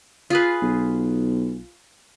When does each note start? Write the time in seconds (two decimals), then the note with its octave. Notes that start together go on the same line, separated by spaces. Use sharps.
0.30 F4 G#4 B4
0.62 B1